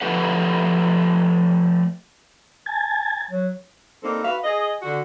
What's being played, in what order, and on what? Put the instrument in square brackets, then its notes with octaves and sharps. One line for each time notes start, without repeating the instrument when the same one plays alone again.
[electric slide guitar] F3 A3 G4 A4 B4 F#5
[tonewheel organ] G#5 A5
[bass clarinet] F#3
[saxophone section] G3 A#3 C4 D#4 A4
F#4 B4 E5 F5
G#4 D#5
D3 F#4